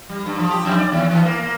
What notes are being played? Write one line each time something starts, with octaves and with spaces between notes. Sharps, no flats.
G3
G2
F3
G4
F2
D5
D#2
E3
A#3
A#3